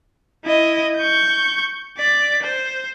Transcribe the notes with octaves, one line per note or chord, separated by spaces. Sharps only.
E4 D#5
C#6 G6
D5 B6
C5